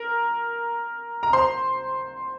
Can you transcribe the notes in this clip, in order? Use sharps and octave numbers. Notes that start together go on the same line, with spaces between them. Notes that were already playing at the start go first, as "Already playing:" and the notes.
Already playing: A#4
A#5
C5 C6